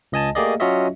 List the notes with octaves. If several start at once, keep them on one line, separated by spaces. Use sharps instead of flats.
C#2 D#5 G#5 A5
A3 A#3 G4 G#4 D5 D#5
F#3 C#4 F4 F#4 D#5 E5